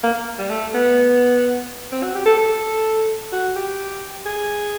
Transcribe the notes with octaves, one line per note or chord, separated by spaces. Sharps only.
A#3
G3
A3
B3
C4
F#4
G4
A4
A4
F#4
G4
G#4